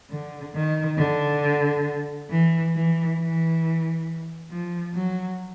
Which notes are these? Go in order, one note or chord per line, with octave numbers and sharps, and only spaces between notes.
D3
D#3
D3
E3
E3
E3
F3
F#3